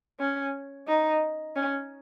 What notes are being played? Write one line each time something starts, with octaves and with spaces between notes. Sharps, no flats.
C#4
D#4
C#4